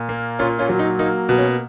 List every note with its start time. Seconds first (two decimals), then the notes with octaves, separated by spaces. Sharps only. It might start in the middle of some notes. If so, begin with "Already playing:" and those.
Already playing: A#2
0.09 A#3
0.39 A#2 C#4 F4
0.59 C#4 F4
0.69 F#3
0.79 D#4
0.99 A#3 D#4
1.29 B2
1.38 C#4